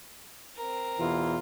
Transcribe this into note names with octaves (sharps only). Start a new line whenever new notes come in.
C4 A#4
E2 B2 E3 F4